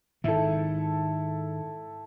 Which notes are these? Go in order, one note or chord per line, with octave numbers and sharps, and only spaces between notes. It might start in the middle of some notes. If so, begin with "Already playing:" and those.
G#2 D#3 E4 A4